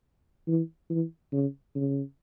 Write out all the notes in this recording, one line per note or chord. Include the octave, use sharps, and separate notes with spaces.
E3
E3
C#3
C#3